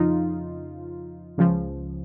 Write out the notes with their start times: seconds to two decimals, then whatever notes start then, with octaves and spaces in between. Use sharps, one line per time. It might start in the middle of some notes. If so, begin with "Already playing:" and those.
Already playing: F2 C#3 F3 D#4 F4
1.38 C#2 C#3 F3